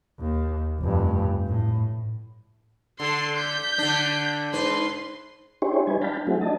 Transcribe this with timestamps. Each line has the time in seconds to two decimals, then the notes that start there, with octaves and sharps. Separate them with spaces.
0.19 D#2
0.80 F1 G2
1.46 A2
3.00 D3 A4 C6
3.36 G6 B6
3.78 D3 D4
4.53 G#2 B4 C6
5.62 D4 E4 G4 G#4 C5 C#5
5.87 G3 D#4 B4 G#5
6.02 D4 F5 G5 A5 B5
6.27 F#3 A3 C4 E4 F#4 G#4
6.41 D4 D#5 A5